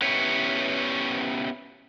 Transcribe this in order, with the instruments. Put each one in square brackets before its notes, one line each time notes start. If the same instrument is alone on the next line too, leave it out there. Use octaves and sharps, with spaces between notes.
[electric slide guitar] B3 C#4 E4 G4 B4 C#5